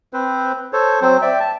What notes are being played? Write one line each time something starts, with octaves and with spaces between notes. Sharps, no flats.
C4 B4 C5
A4 C5 C#5
F#3 C4 C5
D5 E5 G5
A5